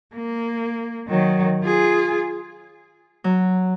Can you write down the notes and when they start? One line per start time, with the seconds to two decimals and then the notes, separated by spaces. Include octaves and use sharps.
0.14 A#3
1.09 D#3 F#3
1.63 F4 G#4
3.24 F#3